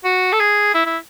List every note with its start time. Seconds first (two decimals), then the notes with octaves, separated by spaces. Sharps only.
0.04 F#4
0.33 A4
0.40 G#4
0.74 E4
0.86 E4